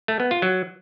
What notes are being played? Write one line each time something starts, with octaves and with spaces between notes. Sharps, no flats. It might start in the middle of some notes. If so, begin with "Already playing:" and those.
A3
B3
F4
F#3